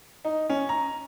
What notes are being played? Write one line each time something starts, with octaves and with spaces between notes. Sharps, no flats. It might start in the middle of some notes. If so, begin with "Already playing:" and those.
D#4
C#4
A#5